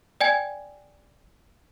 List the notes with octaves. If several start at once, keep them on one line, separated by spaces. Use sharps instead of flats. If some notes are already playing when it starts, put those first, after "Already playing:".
D5 G5 G#5 G#6